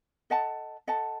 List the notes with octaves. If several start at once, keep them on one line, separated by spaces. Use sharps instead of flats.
A4 D#5 F#5 A5
A4 D#5 F#5 A5